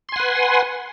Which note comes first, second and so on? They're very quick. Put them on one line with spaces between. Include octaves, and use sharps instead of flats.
C6 G#5 F#5 B4